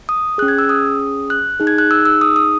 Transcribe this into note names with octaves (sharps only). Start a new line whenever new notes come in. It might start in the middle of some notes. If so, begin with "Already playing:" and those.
D#6
C#4 G#4 F#6
G#6
E6
D#6
F#6
D#4 G#4
G#6
F#6
E6
E6
D#6
D#6